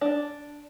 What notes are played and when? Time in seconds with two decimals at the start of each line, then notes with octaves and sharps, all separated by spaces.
0.01 D4